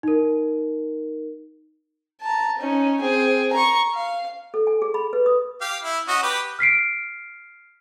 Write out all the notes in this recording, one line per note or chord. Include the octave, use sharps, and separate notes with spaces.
D#4 A#4
A5 A#5
C#4 D#4
C4 G#4
A#5 C#6
F5
A4
G#5
G#4
B5
B4
D#6
G4 F5
E4
C#4 F#4 D#5
G4 B4
F6 B6 C7 D7